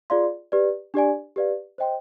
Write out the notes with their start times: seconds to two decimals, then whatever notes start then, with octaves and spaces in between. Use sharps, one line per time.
0.10 F4 G#4 D5 F5 C6
0.52 G4 B4 D5
0.94 D4 G4 D5 G#5
1.36 G4 B4 D5 F5
1.78 C5 D#5 G5 C6